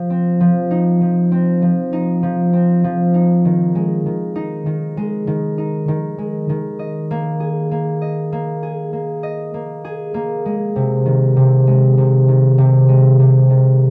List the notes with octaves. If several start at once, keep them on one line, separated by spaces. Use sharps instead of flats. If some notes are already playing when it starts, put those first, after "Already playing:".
Already playing: F3
C4
F3
D#4
F3
C4
F3
D#4
F3
C4
F3
D#4
D#3
G#3
D#3
D#4
D#3
G#3
D#3
D#4
D#3
G#3
D#3
D#5
A#3
G#4
A#3
D#5
A#3
G#4
A#3
D#5
A#3
G#4
A#3
G#3
C3
D#3
C3
G#3
C3
D#3
C3
G#3
C3
D#3